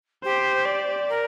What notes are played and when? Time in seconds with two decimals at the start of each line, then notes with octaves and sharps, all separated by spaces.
0.24 G4 C5
0.66 D5
1.08 A#4